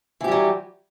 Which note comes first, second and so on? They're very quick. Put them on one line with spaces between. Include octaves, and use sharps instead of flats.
E3 G4 G3 F#3